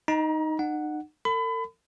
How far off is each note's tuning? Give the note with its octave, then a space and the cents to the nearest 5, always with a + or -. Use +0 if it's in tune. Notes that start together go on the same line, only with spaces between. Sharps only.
D#4 +0 A#5 +35
D#4 -40 F#5 +0
A4 +45 B5 +30